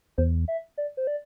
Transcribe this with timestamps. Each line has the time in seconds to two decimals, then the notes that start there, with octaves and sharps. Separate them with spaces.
0.18 E2 C5
0.48 E5
0.78 D5
0.97 C5
1.07 D5